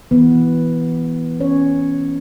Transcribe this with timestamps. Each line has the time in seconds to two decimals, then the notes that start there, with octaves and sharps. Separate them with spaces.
0.11 E3 B3 B4
1.40 C#4 C#5